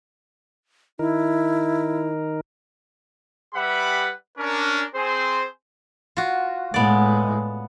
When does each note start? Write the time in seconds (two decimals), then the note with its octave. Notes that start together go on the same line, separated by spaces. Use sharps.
0.99 D#3 D#4 E4 A#4
3.53 G3 G4 B4 E5 F#5 B5
4.38 C#4 D4 A#4
4.94 C4 G#4 C5
6.17 F4 F#4
6.74 A2 G#3 B3 D5